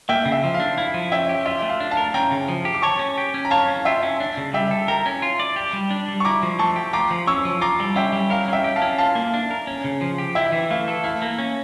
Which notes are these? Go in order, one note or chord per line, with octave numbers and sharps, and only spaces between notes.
A#3 E5 G5
C#3
E5
F3
F5
D4
E4 F5
F3
C#4 E5 G5
G4
F4 E5
A3
F5
D4
F5 A5
A#4
C#4 G5 A#5
C#3
F3
G4
D6
C#5 A5 C#6
C#4
G4
C#4
A#5
C#5 F5 A5
C#4
F4 E5 G5
C#4
D4
C#3
G3 E5 G5
A4
A#4 G5 A#5
C#4
F4
D5
G4
G3
D4
G3
C#6
E4 A#5 D6
F3
A3 A5 C#6
G4
F4 A#5 D6
F3
C#4 C#6 E6
F3
F4 A#5 D6
G3
C#4 E5 G5
G3
A#4 F5
C#4 E5 G5
G4
F5 A5
C#4
F4 F5 A5
A#3
D4
A#4
C#4
C#3
F3
G4
E4 E5 G5
E3
A3 F5
A4
E4 F5
A#3
C#4